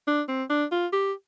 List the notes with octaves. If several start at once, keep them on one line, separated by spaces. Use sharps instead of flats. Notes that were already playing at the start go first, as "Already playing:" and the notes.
D4
C4
D4
F4
G4